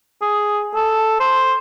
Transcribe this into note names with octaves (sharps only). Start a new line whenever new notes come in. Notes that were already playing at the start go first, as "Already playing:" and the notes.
G#4
A4
C5